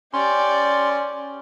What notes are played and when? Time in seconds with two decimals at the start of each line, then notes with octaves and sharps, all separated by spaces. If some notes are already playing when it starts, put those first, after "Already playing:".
0.14 C#4 G4 D5 C6